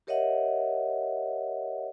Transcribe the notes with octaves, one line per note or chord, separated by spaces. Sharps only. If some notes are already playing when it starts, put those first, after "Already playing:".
G4 A#4 C#5 D#5 E5 F#5